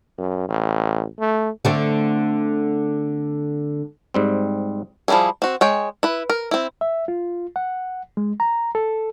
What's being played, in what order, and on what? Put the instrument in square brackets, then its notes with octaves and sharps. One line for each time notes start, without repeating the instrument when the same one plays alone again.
[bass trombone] F#2
A1
A3
[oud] D3 A3 C4
[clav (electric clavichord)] G#2 G3 C4
[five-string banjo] F3 G3 D#4 E4 G#4
C4 F#4
G#3 C#5 G5
E4 B4
A#4
C4 E4
[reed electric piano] E5
F4
F#5
G#3
A#5
A4